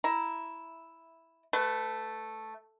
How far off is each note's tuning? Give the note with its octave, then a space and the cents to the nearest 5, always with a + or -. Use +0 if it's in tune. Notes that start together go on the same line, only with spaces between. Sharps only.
E4 +0 A#5 +10
A3 +0 B4 +25